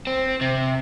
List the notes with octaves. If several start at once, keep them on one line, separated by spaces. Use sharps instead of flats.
C4
C3